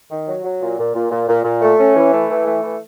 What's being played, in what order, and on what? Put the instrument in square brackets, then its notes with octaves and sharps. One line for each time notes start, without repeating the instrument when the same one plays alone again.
[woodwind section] D#3
F#3
F#3
A#2
A#2
A#2
A#2
A#2
A#2
A3
C#4
E3
A3
E3
A3
E3